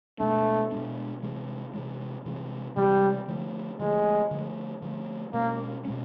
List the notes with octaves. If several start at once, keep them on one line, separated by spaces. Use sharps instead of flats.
B2 G#3 A3 B3 D4
B2 G#3 B3 D4
C3 E3 G#3
C3 E3 G#3
C3 E3 G#3
C3 E3 G3 G#3
D3 F3 A3
D3 F3 G#3 A3
D3 F3 A3
D3 F3 A3
B2 G#3 A#3 C#4
B2 G#3 C#4